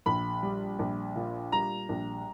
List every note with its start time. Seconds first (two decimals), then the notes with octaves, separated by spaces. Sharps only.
0.06 A#1 B5
0.43 G3
0.79 A#1
1.16 A#2
1.52 G3 A#5
1.89 A#1